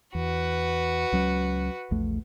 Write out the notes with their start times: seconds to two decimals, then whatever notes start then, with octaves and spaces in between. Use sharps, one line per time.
0.15 E2 F#4 B4
1.12 C#2 F#3 C#4
1.91 A#1 E2 A3